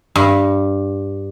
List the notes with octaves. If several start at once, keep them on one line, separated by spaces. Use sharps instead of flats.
G2